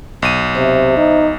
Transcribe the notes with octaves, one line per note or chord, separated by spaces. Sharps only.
B1 D#7
C3 C5 E5
D#4